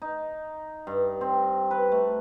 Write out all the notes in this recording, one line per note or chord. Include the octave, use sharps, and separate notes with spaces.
D#4
G2
C4
B4
A3